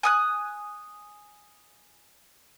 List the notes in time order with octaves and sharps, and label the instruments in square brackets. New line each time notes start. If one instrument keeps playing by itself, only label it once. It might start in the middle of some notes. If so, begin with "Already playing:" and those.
[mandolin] G#5 D#6 F#6